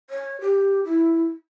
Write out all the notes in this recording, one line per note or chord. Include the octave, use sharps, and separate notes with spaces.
C#5
G4
E4